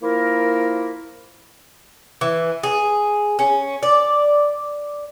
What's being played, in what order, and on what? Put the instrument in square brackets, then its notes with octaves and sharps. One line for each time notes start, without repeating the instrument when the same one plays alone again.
[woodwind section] F3 A#3 E4 A#4
[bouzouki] E3
G#4
C#4
D5